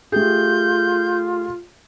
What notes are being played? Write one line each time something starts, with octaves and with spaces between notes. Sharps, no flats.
A3 F4 G4 G#4 G6